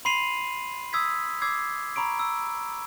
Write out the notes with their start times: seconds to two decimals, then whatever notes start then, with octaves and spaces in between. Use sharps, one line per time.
0.05 B5 C6 C7 D#7 F7 F#7
0.93 D#6 E6 G#6 B6
1.42 D6 E6 G#6 C7
1.96 A#5 B5 C#6 D7
2.19 E6